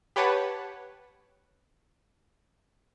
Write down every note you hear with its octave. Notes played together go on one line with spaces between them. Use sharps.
G4 B4 C#5 F#5 A5 B5